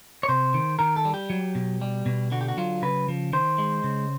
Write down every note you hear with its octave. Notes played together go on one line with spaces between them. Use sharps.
C#5
C3 C5
D#3
D#3 A#4
A4
G3
G4
F#3
B2
G3
B2
D3 F#4
G4
F#4
F#3 F4
C#3 B4
F3
D#3 C5
G#3
C#3